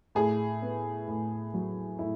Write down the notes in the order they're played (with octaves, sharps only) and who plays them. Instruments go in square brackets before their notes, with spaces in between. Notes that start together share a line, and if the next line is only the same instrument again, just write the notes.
[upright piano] A2 G#4
B3
A2
F#3
A2 E4